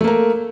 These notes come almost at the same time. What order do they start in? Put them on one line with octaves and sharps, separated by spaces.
A3 A#3 A#4